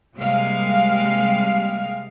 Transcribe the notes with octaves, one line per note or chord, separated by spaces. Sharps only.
C3 G3 G#3 A#3 F5